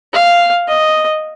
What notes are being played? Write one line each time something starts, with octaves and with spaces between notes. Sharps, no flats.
F5
D#5